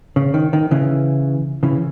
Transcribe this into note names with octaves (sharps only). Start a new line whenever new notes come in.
C#3
D#3
D#3
C#3 E3
C#3 E3